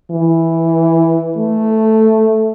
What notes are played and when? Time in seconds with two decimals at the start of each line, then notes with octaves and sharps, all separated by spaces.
0.11 E3
1.38 A3